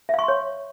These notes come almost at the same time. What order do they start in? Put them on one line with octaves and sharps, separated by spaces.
E5 F5 C#6 C6 C#5